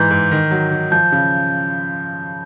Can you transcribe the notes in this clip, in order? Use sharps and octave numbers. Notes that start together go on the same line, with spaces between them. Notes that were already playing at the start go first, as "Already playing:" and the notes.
Already playing: G#2 E3 G6
G#2
D#3
F#3
D#3
F3 G6
C#3